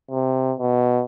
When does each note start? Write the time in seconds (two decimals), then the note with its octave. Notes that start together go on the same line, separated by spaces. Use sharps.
0.11 C3
0.59 B2